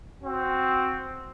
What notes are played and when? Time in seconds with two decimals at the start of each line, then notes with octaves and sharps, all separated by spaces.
0.24 C4 F#4